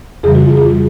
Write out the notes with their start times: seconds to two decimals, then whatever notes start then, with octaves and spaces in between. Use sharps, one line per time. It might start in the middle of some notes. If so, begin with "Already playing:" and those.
0.23 F2 C#3 E3 G3 G#4
0.35 F#4
0.46 F4
0.57 G#4
0.68 C#3 E3 G3